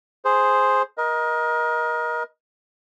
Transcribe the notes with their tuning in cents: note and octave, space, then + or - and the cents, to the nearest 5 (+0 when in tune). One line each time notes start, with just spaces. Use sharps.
G#4 +0 C5 +0
A#4 +30 D#5 +10